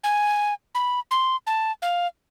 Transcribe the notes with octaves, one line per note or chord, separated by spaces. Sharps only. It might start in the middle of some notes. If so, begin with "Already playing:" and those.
G#5
B5
C6
A5
F5